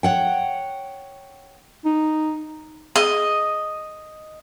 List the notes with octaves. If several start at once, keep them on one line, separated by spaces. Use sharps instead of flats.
C#5 F#5 G5
D#4
G#4 D#5